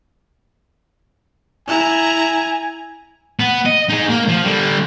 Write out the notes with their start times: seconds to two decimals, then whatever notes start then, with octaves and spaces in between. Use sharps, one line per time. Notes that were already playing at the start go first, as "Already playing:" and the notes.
1.68 E4 G#5 A#5
3.39 B3
3.66 D#5
3.89 D#4 G#4
4.09 A#3
4.28 F3
4.44 D3 G3